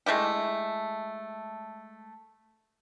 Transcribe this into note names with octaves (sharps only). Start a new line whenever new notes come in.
G#3 A3 E4 G4